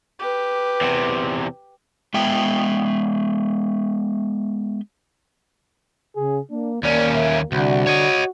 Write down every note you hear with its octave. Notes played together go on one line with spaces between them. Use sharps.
G4 B4
E2 C3
G#3 B3 E5 G5
C#3 G#4
A#3 D4
D#2 A#3 C#4 D5
E5
C2 D3 F#4
C#5 D#5